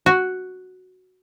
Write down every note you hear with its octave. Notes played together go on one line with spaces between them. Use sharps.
F#4